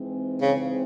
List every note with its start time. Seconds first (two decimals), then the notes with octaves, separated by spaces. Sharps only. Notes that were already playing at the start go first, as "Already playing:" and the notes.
Already playing: G#2 E3 G#3 C4
0.42 C#3